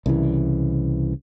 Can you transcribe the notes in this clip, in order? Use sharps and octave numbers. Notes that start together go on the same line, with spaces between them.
C2 C#3 E3